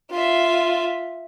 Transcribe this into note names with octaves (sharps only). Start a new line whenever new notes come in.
F4 E5